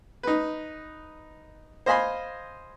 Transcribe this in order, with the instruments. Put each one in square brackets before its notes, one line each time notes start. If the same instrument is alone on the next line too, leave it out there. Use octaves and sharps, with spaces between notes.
[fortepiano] D#4 B4
C5 D#5 F5 G#5 B5 C6